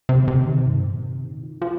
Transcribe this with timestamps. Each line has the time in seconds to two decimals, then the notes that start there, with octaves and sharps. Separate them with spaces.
0.09 C3
0.28 C3
0.47 D#3
0.66 G2
0.85 A#2
1.04 C3
1.24 D#3
1.43 F3
1.62 F3